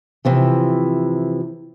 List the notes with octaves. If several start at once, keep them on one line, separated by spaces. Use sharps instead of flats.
C3 E3 F3